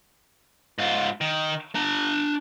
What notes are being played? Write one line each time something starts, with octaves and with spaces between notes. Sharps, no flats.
G#2 F4
D#3
D4 A#5